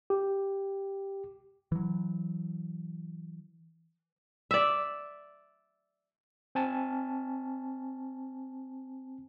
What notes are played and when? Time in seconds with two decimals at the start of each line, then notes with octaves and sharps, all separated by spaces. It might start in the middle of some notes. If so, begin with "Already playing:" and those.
0.10 G4
1.72 E3 F#3
4.51 D5 E5
6.55 C4 G#5 A5